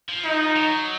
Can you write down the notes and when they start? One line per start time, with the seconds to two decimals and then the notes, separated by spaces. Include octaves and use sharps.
0.09 F3
0.25 D#4
0.56 F#3